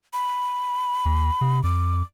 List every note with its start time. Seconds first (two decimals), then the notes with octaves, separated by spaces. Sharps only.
0.13 B5
1.05 D#2
1.41 C3
1.63 F2 D6